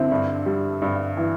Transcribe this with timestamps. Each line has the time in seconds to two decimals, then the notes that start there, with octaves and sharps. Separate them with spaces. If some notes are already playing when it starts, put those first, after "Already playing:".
Already playing: D3 C4 E4
0.12 G2
0.46 G3
0.82 G2
1.17 E3